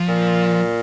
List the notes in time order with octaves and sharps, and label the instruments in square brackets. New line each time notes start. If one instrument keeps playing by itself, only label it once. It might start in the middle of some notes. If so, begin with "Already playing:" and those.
Already playing: [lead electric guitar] F3
[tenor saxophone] A#2